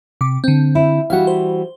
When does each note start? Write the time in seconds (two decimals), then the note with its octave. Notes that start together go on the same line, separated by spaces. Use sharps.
0.21 C3 D6
0.44 D3 C4
0.75 E4
1.10 E3 G3 F#4 F5 F#5
1.27 C5